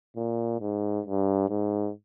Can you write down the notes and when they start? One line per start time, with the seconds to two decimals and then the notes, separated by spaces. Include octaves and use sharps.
0.16 A#2
0.61 G#2
1.06 G2
1.50 G#2